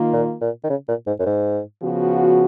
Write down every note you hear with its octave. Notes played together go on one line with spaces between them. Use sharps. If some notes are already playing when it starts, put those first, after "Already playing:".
Already playing: D#3 A#3 F4
A#2
A#2
D#3
C#3
A#2
G#2
F#2
G#2
C#3 F3 B3 F#4